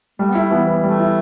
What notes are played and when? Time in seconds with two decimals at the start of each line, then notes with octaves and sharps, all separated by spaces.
0.19 G3 A3
0.30 B3
0.35 A3 E4
0.51 E3 B3
0.67 B3
0.83 G3 A3
1.00 E4